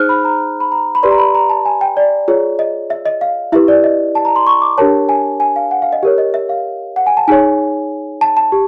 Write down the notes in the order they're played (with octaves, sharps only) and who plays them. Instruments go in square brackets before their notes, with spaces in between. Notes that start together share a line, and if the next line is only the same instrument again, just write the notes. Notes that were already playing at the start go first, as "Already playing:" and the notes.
Already playing: [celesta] D#4 G#4 C5 F6 F#6
B5
A#5
B5
A#5
B5
G4 B4 D5 C6
A#5
B5
A#5
A5
G#5
G5
D5
F4 G#4 C#5
D#5
E5
D#5
F5
E4 G4 B4 E5
D5
D#5
A5
A#5
C6
C#6
D6
D4 G4 A#4 C#5 A5
G#5
G#5
F5
F#5
F5
D#5
G4 A#4 C#5
D#5
E5
F5
F#5
G#5
A5
D#4 G#4 C#5 G#5
A5
A5
G4